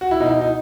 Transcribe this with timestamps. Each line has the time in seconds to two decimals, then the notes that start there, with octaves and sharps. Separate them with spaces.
0.01 F#4
0.11 E4
0.20 B2 D#4
0.26 E4
0.31 D#4
0.41 D#4